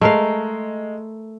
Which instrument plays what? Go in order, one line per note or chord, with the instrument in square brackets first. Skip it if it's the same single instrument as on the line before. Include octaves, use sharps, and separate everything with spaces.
[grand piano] G#3 [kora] A3 A#4 F5